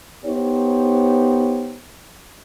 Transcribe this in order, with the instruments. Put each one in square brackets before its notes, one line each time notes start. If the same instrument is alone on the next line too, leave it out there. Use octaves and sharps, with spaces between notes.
[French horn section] B3 D#4 G4 C5 C#5